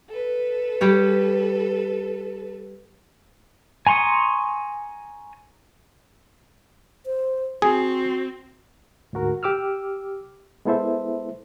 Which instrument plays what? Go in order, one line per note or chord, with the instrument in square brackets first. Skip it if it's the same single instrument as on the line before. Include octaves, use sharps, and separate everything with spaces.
[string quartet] A4 B4
[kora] G3 G4 C#5
[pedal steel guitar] G#5 A#5 C6 C#6 D#6
[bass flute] C5
[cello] C4 [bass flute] F#4 [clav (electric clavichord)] G#4
[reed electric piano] D2 G#2 F#4 A#4
G4 D6 E6 F6
G#3 B3 E4 A4 C5 E5